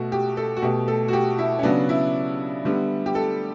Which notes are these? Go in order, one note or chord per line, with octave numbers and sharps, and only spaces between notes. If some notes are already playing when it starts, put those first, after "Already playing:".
Already playing: B2 A3 F#4
G4
A4
F#4
B2 A3 G4
A4
F#4
G4
E4
C#4
C#3 F#3 B3 D4
E4
D3 G3 B3
G4
A4